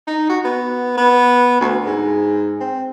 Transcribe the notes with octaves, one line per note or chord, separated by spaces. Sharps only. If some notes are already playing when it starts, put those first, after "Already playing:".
D#4
F#4
B3
B3
D2
G#2
C4